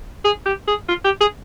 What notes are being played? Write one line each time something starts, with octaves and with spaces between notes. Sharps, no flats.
G#4
G4
G#4
F4
G4
G#4